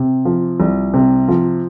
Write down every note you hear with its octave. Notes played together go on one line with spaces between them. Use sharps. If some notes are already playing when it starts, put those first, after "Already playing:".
Already playing: C3
F3
C2
C3
F3